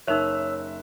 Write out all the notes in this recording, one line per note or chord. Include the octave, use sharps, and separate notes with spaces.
F#1 D#4 A#4 C#5 E5 E6 F#6 F7